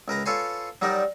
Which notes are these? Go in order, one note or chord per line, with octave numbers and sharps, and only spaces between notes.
C#2 A#4 B4 A#5
F4 A4 B4 C#5 G#5 C6
F#3 G3 D#4 A#4 D5